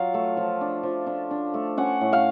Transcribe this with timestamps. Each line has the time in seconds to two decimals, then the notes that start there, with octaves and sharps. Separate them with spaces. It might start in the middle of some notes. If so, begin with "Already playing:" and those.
Already playing: F#3 F4 F5
0.14 A3
0.37 F3
0.61 D4
0.83 F3
1.07 D4
1.31 D4
1.54 A3
1.77 C#4 F#5
2.01 A2
2.13 F5